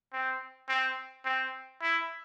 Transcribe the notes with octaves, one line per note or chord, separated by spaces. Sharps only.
C4
C4
C4
E4